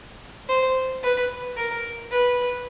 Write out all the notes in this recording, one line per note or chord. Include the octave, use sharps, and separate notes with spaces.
C5
B4
A#4
B4